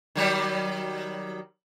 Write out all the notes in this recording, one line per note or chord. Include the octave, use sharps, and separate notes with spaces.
D#3 F#3 G3